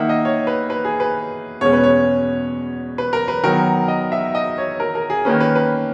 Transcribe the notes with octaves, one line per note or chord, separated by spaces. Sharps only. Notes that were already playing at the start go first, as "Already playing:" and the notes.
Already playing: D#3 A#3 D#4 E5 F#5
D#5
C#5
B4
B4
G#4
B4
E2 B2 G#3 C#4 C#5
B4
C#5
B4
A#4
B4
D#3 F#3 B3 A#4
D#5
E5
D#5
C#5
A#4
A#4
G#4
D#3 A#3 C#4 B4
B4
B4